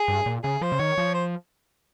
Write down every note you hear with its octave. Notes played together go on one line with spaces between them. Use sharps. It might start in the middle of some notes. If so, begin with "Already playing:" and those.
Already playing: G#4
G2
A#2
C#3 G#4
F3 C5
C#3
D#3 C#5
F3
C5